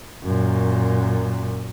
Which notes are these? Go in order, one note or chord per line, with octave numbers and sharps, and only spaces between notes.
F#2 A#2